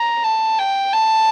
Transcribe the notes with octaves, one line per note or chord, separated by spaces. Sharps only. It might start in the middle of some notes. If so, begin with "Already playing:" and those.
Already playing: A#5
A5
G5
A5